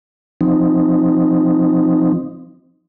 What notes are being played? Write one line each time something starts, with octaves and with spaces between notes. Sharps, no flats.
F3 C4 D#4